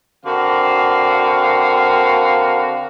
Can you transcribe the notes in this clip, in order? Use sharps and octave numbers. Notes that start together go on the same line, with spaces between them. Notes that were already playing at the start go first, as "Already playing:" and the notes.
D3 C4 F#4 A#4 F5